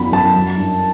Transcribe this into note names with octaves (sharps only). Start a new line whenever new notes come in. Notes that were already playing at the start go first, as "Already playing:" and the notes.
Already playing: F#2 F#3 B3 B5
F#2 A5
F#3
G2